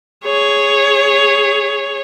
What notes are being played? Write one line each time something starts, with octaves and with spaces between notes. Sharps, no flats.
G#4 C#5